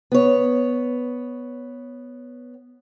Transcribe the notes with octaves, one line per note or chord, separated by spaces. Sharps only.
B3 C#5